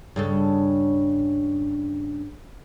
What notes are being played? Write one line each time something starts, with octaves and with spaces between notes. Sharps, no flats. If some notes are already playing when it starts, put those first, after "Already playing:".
G2 C#3 A4